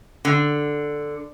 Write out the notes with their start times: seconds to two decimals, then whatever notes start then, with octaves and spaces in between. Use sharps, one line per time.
0.25 D3